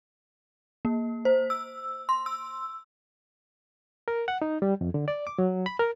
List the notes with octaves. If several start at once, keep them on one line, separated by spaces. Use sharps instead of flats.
A#3
C5
E6
C6
E6
A#4
F#5
D#4
G3
F2
D3
D5
D6
F#3
B5
A#4